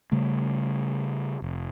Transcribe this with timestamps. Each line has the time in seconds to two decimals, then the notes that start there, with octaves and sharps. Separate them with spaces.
0.12 C#3 G3 A3
1.42 F1